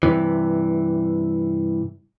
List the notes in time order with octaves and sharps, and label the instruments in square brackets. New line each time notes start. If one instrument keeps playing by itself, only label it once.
[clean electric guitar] G2 C3 E3